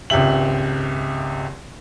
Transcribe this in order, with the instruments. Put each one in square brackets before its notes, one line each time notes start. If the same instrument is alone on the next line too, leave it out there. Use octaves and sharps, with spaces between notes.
[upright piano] G#1 C#2 G4 E5 F#7